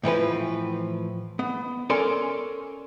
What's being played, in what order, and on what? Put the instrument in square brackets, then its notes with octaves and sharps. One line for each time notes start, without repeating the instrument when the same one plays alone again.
[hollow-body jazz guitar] A2 E3 F3 B4
B3
C#4 A4 A#4 D5 G#5 C6